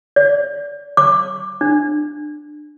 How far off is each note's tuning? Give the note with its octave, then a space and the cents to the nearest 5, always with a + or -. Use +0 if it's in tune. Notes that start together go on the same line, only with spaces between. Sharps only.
D5 -30
D6 +15
D4 +25